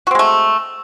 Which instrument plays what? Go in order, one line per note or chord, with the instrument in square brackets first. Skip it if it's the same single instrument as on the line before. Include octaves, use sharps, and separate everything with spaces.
[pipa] F#4
C4
G#3
A3